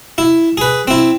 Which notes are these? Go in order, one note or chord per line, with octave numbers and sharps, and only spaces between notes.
E4
G#4 B4
C4 E4